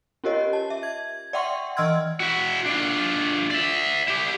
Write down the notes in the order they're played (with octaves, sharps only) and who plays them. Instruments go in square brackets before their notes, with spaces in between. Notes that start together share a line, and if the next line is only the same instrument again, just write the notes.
[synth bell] C#4 F4 G4 A#4 C#5 D#5
A5
E5
G#6
D5 E5 F#5 G5 C6 C#6
E3 D#5 C6 E6 F6 G#6
[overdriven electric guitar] E4 F#4
D4 F4
D5 E5
E4 G4